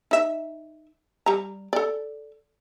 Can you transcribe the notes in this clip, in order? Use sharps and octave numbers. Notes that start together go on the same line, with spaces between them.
D#4 E5
G3 A#5
A4 D5